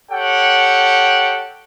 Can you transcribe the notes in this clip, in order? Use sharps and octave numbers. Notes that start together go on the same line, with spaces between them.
G4 A4 C#5 F#5 G5